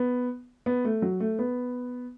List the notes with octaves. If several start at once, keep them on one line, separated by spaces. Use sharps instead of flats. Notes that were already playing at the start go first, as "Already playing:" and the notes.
Already playing: B3
B3
A3
F#3
A3
B3